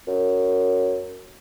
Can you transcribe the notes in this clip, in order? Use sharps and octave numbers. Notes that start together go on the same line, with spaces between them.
F#2